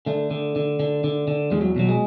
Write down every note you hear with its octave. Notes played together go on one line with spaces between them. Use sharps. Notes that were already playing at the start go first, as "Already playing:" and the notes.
D3 A3
D3
D3
D3
D3
D3
E2 G#3
F#3
B2 F#3
G#3